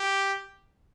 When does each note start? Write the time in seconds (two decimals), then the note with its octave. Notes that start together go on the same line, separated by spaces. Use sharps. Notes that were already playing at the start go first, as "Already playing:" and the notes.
Already playing: G4